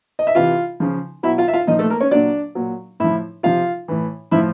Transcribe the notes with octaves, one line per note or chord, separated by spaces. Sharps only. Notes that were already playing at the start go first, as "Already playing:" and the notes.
D#5
E5
C3 E3 F4 F5
C#3 F3
B2 F#3 E4 E5
F4 F5
E5
F4 F5
A#2 F3 D#4 D#5
A3 A4
A#3 A#4
C#4 C#5
A#2 F#3 D4 D5
A#2 F#3
A2 F3 E4 E5
C3 F3 F4 F5
A2 E3
A2 F3 E4 E5